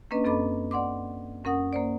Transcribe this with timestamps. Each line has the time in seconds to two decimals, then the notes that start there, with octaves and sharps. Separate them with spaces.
0.11 A#3 C#4 D4 B4 D#5
0.24 F#2 C4 A4 D#5 B5 D6
0.71 D5 F#5 C6 D6
1.44 F#2 C#4 A#4 F#5 D#6
1.73 A#3 C5 D5